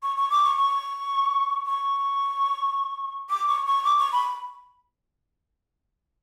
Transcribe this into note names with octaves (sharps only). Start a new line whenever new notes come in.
C#6
C#6
D6
C#6
C#6
C#6
D6
C#6
C#6
D6
C#6
B5